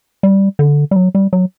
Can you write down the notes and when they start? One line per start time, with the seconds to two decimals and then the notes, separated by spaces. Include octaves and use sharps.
0.23 G3
0.59 D3
0.91 G3
0.96 F#3
1.15 G3
1.33 F#3